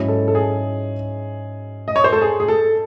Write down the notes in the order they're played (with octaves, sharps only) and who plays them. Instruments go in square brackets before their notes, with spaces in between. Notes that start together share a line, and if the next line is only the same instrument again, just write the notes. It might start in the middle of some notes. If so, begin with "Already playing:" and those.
Already playing: [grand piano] G#2 F#3 C#4 E4
[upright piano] A4
A4
G#4
D#5
C#5
C5
A4
G#4
G#4
A4